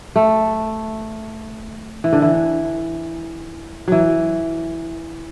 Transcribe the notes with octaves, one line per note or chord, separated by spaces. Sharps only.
A3
E3
D3
E3
E3 F#3